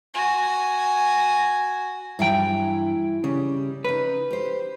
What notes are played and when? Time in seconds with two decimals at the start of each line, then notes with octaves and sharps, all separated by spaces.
0.14 F#4 G#5
2.19 G2 E3 F#3 E4 G5
3.24 C#3 G3
3.85 C#4 D#4 B4
4.30 G4 C5